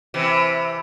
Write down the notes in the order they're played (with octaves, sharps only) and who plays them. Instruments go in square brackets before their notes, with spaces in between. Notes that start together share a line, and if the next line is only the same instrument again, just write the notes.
[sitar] C3 E3